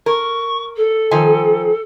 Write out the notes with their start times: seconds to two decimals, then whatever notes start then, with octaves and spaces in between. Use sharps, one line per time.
0.06 A#4 C#6
0.76 A4
1.11 D#3 F3 G#5